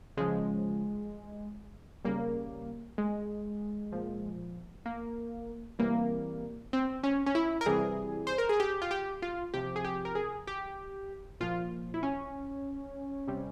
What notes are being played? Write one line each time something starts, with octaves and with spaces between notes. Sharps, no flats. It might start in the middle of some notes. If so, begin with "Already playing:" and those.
C#3 F3 G#3
C#3 G3 A#3
G#3
A#2 F3
A#3
C3 E3 G3 A#3
C4
C#4
C#4
E4
A#4
C3 E3 G3 G#4
C5
A#4
G#4
G4
F4
G4
F4
C3 F3 G4
G#4
G4
A#4
G#4
G4
A#2 F3 F4
E4
C#4
C3 G3